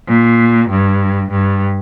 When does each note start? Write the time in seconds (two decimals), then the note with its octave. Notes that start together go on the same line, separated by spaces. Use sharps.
0.08 A#2
0.70 G2
1.31 G2